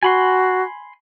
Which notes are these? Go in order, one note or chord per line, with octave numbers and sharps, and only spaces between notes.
F#4 G#5 B5 C6